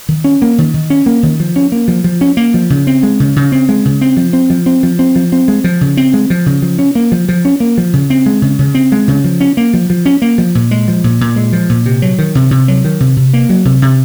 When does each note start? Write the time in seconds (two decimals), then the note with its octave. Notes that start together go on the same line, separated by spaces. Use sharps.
0.09 D#3
0.24 C#4
0.42 A#3
0.58 D#3
0.74 D#3
0.90 C#4
1.06 A#3
1.23 D#3
1.40 F3
1.56 C#4
1.72 A#3
1.88 F3
2.04 F3
2.21 C#4
2.37 A#3
2.54 F3
2.70 C#3
2.87 C4
3.03 G#3
3.20 C#3
3.36 C#3
3.52 C4
3.69 G#3
3.85 C#3
4.01 C4
4.17 F3
4.33 C4
4.50 F3
4.66 C4
4.83 F3
4.99 C4
5.16 F3
5.32 C4
5.48 G#3
5.64 F3
5.81 C#3
5.97 C4
6.14 G#3
6.30 F3
6.46 C#3
6.62 F3
6.79 C#4
6.95 A#3
7.12 F3
7.29 F3
7.45 C#4
7.60 A#3
7.78 F3
7.93 C#3
8.10 C4
8.26 G#3
8.42 C#3
8.59 C#3
8.75 C4
8.92 G#3
9.08 C#3
9.24 F3
9.41 C#4
9.57 A#3
9.74 F3
9.90 F3
10.06 C#4
10.22 A#3
10.38 F3
10.55 A#2
10.71 G#3
10.88 F3
11.04 A#2
11.21 A#2
11.36 G#3
11.53 F3
11.69 A#2
11.86 C3
12.02 F#3
12.19 D#3
12.35 C3
12.51 C3
12.68 F#3
12.84 D#3
13.00 C3
13.17 C3
13.33 A#3
13.49 F#3
13.65 C3
13.82 C3